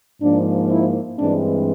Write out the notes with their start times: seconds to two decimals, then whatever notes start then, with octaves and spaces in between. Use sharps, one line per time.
0.21 G#2 F3 A#3 D4
0.70 E4
1.19 G2 E3 G#3 C4 D4